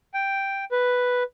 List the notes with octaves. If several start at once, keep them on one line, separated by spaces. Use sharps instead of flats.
G5
B4